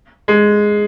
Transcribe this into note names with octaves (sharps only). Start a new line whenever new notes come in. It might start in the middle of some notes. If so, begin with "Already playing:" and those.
G#3